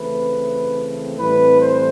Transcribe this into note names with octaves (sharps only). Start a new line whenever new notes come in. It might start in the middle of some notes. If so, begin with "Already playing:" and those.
Already playing: C#3 E3 A3 C4 B4
A2 E3 G3 C4 B4
C5